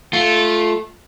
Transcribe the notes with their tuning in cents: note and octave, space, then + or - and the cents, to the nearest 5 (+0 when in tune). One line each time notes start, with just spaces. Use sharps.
A3 -15 F4 +0